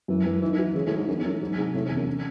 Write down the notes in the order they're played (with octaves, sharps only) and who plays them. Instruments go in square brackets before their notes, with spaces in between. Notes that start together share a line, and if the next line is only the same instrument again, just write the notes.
[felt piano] F#2 [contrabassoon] E3
[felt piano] F#2 [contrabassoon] E3
[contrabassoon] E3 [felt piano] D#4
[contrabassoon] D#3
[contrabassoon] E3 [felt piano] F#4
[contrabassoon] C#3 [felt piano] E3
[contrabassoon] A2
[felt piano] E3
[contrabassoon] G#2
[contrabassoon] F#2 [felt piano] D#4
[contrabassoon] E2
[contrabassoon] F#2 [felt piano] F#4
[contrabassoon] A2
[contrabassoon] G#2 [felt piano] F#3
[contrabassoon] G#2 [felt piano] C3
[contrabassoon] A2 [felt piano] C3
[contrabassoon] G#2
[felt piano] E2
[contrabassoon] F#2
[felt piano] C#4